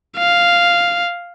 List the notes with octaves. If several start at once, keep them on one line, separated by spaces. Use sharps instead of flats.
F5